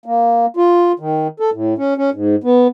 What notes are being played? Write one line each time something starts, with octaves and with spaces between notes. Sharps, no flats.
A#3
F4
D#3
A4
A2
C#4
C#4
G#2
B3